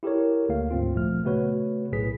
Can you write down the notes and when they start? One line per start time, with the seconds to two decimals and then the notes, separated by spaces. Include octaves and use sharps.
0.03 E4 G4 A4 A#4 C#5
0.49 D2 A#3 F5
0.71 D2 G#2 C4 F4
0.94 G1 A#2 F3 A3 F6
1.24 C#3 A3 B3 F#4 B4 C#5
1.92 B1 A2 G#4 B4 B6